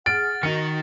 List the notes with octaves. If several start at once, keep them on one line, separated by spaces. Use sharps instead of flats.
G#4 F#5 F6 A6 D7
D#3 D#4 F#4 C#7